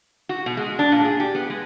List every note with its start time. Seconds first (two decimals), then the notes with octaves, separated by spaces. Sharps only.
0.29 F#4
0.46 B2
0.57 G#3
0.79 D4
0.92 A#2
1.05 G#4
1.20 G4
1.35 B3
1.50 G#3